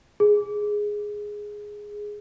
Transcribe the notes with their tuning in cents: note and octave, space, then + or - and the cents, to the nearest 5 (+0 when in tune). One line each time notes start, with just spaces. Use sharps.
G#4 +0